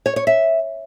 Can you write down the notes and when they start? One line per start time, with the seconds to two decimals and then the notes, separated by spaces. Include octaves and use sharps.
0.06 C#5
0.16 C#5
0.27 E5